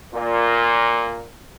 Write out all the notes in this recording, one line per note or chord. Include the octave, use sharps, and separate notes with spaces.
A#2